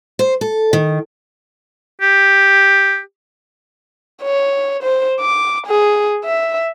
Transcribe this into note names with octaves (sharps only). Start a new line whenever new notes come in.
C5
A4
D#3
G4
C#5
C5
D6
G#4
E5